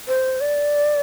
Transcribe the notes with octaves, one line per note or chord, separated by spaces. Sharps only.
C5
D5